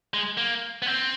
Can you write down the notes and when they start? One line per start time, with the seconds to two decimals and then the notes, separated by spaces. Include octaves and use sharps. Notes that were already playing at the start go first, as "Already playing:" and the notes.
0.14 G#3
0.37 A#3
0.82 B3
0.86 C4